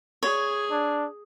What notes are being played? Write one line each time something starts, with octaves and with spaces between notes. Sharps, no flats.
G#4 C#5
D4